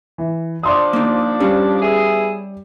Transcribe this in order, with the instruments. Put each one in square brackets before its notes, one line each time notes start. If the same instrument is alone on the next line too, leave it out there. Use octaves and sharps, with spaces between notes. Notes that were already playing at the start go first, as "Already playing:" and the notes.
[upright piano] E3
[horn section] F3 D4 [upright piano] D5 C6 D#6
[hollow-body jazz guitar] A#3 D#4
[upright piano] G3 [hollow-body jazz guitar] C#4 F5
[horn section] B3 E4 G#4